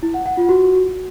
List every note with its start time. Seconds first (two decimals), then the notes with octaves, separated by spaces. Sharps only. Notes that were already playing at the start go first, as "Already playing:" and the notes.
0.03 E4
0.14 F#5
0.26 F#5
0.37 F4
0.49 F#4